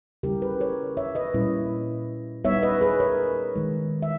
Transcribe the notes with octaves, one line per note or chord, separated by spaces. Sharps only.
C#3 G3 C#4 E4 G4 A#4
G#4 B4
A#4 C#5
C#5 E5
B4 D#5
A#2 G3 C#4 E4
G3 B3 D#4 C#5 E5
B4 D#5
G#4 B4
A#4 C#5
D#3 G#3 D#4
E5